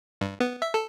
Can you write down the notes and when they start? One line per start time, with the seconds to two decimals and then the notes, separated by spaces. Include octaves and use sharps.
0.21 G2
0.40 B3
0.62 E5
0.74 A4